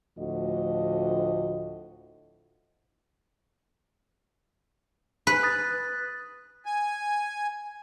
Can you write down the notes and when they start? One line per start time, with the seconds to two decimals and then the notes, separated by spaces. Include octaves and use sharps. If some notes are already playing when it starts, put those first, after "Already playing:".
0.18 D2 A2 F3 F#4 D#5
5.27 B4
5.43 D#6 F#6 A6
6.66 G#5